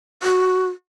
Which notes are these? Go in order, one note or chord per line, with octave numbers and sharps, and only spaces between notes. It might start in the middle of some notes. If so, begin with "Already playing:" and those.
F#4